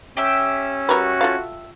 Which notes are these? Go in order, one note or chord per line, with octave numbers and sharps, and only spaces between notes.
C#4 G4 E5
G3 F#4 A#4 B4
F4 A4 F5